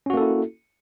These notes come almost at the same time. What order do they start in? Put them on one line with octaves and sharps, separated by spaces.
C#4 F#4 A#3 A4 E4